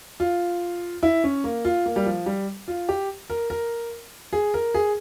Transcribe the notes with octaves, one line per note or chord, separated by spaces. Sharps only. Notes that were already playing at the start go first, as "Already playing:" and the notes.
F4
E4
C#4
A#3
F4
A#3
G3
F3
G3
F4
G4
A#4
A#4
G#4
A#4
G#4